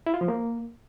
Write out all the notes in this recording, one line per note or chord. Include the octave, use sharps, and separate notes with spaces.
E4
F4
F3
A#3